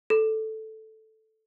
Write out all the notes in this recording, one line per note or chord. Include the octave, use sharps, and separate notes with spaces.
A4